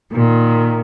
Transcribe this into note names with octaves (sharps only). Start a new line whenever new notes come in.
A#2 D#3